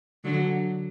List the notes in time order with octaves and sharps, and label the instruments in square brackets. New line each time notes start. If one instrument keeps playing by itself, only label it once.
[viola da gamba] D3 F#3